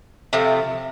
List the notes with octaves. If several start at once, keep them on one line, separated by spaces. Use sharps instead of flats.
C3 F3 A3